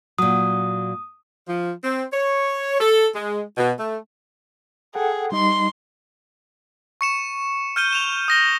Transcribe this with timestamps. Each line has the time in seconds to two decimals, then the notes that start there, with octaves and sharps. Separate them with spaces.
0.18 A#2 F#3 D#6
1.47 F3
1.84 C4
2.13 C#5
2.80 A4
3.15 G#3
3.57 B2
3.79 A3
4.95 G#4 A4 F#5 G5
5.32 G3 D#4 D#5 C6
7.01 C#6 C#7 E7
7.76 F6 G6 D#7 G7
7.93 E7 F7
8.28 D#6 A#6 G7